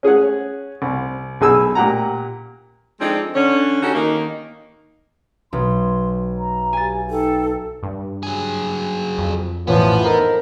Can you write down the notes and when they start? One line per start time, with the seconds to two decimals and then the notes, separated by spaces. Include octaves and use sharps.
0.03 C#4 G#4 C#5 F#5
0.82 C2
1.41 B1 G#4 G#5 E6
1.75 A#2 G4 F#5 A#5
3.00 F3 G#3 C4 D4 D#4 A4
3.35 D3 C#4
3.82 C#4 D#4 F#4 G4 A4 C#5
3.95 D#3 A#3 D#4
5.53 B1 F#3 C6
6.38 A#5
6.73 G4 G#5 A6
7.10 D#4 A4 G5
7.83 G2
8.23 F#3 G#4
9.18 F2
9.68 A1 E3 F3 B3 C#5
10.03 D#4 A4 A#4 C5